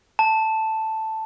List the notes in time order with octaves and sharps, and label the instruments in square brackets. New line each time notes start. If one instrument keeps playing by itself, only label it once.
[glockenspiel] A5